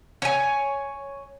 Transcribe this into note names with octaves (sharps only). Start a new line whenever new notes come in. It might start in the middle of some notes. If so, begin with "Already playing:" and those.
C#5 G#5